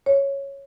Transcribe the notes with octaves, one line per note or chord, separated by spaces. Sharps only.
C#5